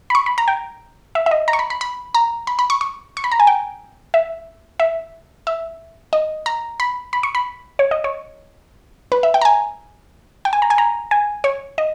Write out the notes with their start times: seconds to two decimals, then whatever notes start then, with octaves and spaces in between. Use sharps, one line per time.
0.10 B5
0.15 C#6
0.26 B5
0.38 A#5
0.48 G5
1.15 E5
1.26 E5
1.31 D#5
1.48 A#5
1.53 C#6
1.59 B5
1.70 B5
1.81 B5
2.15 A#5
2.47 B5
2.59 B5
2.70 C#6
2.81 C#6
3.17 C#6
3.24 B5
3.32 A#5
3.40 G#5
3.47 G5
4.14 E5
4.80 E5
5.47 E5
6.13 D#5
6.46 A#5
6.80 B5
7.13 B5
7.23 C#6
7.35 B5
7.79 C#5
7.91 D#5
8.04 C#5
9.12 B4
9.23 E5
9.34 G5
9.41 A#5
9.45 G#5
10.45 G5
10.53 G#5
10.62 A#5
10.70 G#5
10.78 A#5
11.11 G#5
11.44 C#5
11.78 D#5